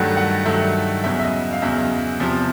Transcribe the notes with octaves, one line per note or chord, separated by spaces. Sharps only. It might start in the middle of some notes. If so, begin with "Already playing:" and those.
Already playing: G2 D#3 F#3 A3 F#5
F#5
G2 D#3 F#3 A3 E5
E2 C#3 F#3 E5
E5
D#5
E5
F5
E2 C#3 F#3 E5
E2 C3 F3